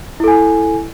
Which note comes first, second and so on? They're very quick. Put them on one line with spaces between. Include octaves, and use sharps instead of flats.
E4 A4 G#5